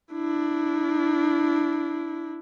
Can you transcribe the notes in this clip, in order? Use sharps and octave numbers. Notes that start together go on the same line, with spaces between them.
D4 E4